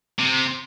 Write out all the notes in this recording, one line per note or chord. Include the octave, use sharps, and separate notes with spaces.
C3